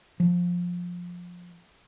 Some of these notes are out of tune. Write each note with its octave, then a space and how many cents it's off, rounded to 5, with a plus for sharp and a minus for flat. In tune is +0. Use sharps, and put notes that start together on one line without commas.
F3 +15